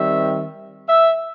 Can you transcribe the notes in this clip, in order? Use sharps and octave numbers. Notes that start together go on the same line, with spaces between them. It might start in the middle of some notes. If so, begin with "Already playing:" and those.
Already playing: D#3 G3 C4 E5
E5